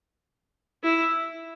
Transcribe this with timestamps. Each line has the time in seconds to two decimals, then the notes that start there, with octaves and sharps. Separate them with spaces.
0.84 E4